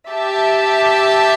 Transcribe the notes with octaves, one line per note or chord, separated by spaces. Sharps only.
G4 E5 A5